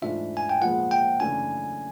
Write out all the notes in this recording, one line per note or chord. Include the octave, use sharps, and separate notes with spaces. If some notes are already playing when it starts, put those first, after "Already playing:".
G#2 E3 A3 D4 F4 E5
G#5
G5
A#2 F3 G#3 B3 F#5
G5
F#2 C#3 E3 A3 D4 G#5